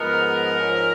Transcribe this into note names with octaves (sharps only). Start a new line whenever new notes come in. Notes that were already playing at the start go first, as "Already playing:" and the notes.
Already playing: G#2 F3 G#3 B3 A#4
G#2 F3 A#3 C#4